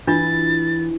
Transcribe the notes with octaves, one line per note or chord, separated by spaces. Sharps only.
E3 D4 F4 A6